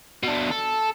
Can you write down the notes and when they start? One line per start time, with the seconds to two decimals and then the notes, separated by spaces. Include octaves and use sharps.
0.23 B2 D4
0.51 A4